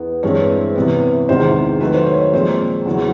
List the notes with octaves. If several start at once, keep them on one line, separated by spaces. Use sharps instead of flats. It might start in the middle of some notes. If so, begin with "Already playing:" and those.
Already playing: E2 B3
G2 E3 G#3 C4 C#5
C3 E3 G3 B3
E2 C3 D#3 G#3 C5
D#3 F#3 A3 B4
C5
C#5
C#5
A#2 F3 G#3 C4 C5
E2 C#3 F#3